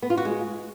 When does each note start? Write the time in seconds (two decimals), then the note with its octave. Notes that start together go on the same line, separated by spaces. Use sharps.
0.02 B3
0.10 F4
0.17 F#4
0.25 G#3